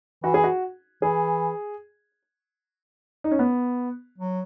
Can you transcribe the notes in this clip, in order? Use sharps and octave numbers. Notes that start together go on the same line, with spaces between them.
E3 F#4
G#4
F#4
E3 G#4
D#4
C#4
B3
F#3